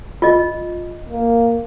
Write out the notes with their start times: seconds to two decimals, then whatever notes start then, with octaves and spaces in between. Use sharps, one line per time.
0.22 F4 D#5
1.09 A#3